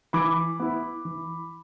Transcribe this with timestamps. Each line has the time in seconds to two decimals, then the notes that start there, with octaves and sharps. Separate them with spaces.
0.13 E3 B5 D6
0.60 B3 E4
1.05 E3